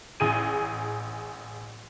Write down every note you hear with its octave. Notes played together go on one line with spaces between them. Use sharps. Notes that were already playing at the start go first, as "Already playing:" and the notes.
A1 G#4 D#7